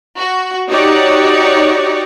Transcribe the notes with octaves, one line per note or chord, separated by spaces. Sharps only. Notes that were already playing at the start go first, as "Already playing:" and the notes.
F#4
D#4 F#4 G4 C#5 D5